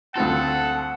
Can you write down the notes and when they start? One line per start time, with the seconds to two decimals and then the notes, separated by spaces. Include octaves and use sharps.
0.16 D2 C4 F4 A4 F#5